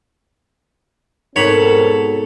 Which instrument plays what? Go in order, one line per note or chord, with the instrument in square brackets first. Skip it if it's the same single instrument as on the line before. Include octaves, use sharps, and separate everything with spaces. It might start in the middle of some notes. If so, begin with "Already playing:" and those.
[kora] G#2 B2 [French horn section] C4 F#4 A#4 [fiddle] A4 [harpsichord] C#5 B5